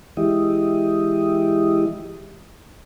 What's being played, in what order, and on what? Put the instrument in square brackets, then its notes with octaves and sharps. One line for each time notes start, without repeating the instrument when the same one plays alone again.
[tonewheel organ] E3 G#3 E4 G4 D#5